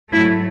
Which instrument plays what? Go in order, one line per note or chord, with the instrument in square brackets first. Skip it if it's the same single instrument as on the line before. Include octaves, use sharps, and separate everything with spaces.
[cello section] G#2 F#3 A3 E4